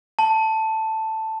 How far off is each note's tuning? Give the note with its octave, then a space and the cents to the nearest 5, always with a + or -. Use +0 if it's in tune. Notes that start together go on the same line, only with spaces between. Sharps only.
A5 +5